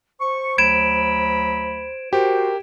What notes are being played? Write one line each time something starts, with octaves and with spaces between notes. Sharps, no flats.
C5 C#6
D2 F#3 B5 G#6 D7 E7
F#4 G4 A#4 C5